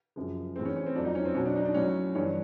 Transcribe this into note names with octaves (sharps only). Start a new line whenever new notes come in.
F#2 C#3 F3 G#3
A2 E3 G#3 C4
C#4
C#4
C4
F2 D3 F#3 D4
D#4
C#4
C4
B2 F#3 C#4
D4
D#4
D4
A2 F#3 C#4
G2 E3 G3 C#4